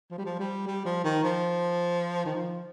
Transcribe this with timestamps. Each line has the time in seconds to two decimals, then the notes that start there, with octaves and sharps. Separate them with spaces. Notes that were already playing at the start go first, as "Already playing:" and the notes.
0.11 F3
0.18 G3
0.26 F3
0.39 G3
0.67 G3
0.85 F3
1.04 D#3
1.24 F3
2.25 D#3
2.35 F3